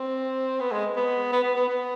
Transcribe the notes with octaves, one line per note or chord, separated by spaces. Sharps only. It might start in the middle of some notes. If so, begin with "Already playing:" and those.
Already playing: C4
B3
G#3
B3
B3
B3
B3
B3